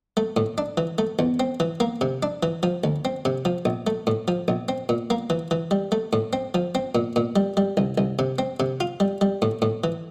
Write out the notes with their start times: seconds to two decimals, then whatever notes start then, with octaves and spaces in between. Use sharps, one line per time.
0.17 A3
0.37 A2
0.58 D4
0.77 E3
0.98 A3
1.19 E2
1.40 C4
1.60 E3
1.80 A#3
2.01 C3
2.23 D4
2.43 E3
2.63 F3
2.84 D2
3.05 C4
3.25 C3
3.45 F3
3.65 A#1
3.87 A3
4.07 A2
4.28 F3
4.48 A#1
4.69 C4
4.89 A#2
5.10 A#3
5.30 E3
5.51 E3
5.71 G3
5.92 A3
6.13 A2
6.33 C4
6.54 F3
6.75 C4
6.95 A#2
7.16 A#2
7.36 G3
7.57 G3
7.77 C2
7.98 C2
8.19 C3
8.39 C4
8.60 C3
8.80 F4
9.00 G3
9.21 G3
9.42 A2
9.62 A2
9.84 E3